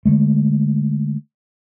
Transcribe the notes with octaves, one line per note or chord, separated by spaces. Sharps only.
D3 G#3 A3